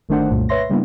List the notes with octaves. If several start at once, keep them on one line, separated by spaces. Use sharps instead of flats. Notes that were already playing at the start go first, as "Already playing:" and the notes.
G1 D#3 A3 D4 C5 F#5
C2 F#2 A#2 A3
B4 C#5 E5 C6 A#6
C#3 G3 A#3 B3 D4 E4